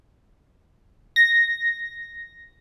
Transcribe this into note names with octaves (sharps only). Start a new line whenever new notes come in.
A#6